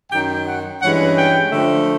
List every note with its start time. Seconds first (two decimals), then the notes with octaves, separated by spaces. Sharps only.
0.11 F#2 D#3 F#3 G5
0.46 F#5
0.81 G2 E3 G#3 C#4 F#5
1.16 G5
1.51 D3 F3 A3